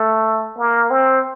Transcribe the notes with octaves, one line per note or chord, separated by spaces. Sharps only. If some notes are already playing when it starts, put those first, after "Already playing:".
Already playing: A3
A#3
C4